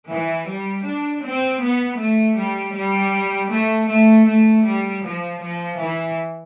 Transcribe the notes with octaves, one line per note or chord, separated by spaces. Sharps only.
E3
G3
D4
C4
B3
A3
G3
G3
A3
A3
A3
G3
F3
F3
E3